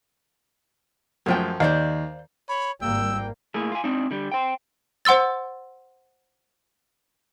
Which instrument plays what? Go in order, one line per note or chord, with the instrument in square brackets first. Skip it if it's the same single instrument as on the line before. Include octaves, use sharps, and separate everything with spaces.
[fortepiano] F#2 F3 [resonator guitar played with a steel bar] G#3 A3 G5
[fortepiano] D#2 [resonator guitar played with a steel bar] C5 D5 F5
[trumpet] C#5 [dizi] B5
[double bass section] G#1 G3 A#3 [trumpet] G5 [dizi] E6
[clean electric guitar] A2 A3 A#3 G#4
F4 G#5
C4 D4 D#4
D3 G3
C5 G5
[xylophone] C5 F#5 C6 E6 A6